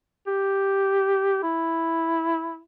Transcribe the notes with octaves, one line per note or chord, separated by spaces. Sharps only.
G4
E4